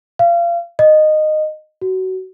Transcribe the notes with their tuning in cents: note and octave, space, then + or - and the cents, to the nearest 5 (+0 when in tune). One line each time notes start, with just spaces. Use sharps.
F5 -30
D#5 -15
F#4 +20